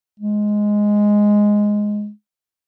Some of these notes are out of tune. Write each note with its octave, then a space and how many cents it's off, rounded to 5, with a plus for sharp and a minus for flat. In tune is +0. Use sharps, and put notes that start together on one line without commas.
G#3 +0